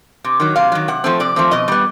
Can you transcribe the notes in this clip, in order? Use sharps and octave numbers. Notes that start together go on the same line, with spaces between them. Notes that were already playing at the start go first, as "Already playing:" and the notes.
C3
D#3 F#3
C3 F5
D#3 F#3
C3 F#5
F3 A3 C4
C3 D5
F3 A3 C4
B2 D#5
G3 B3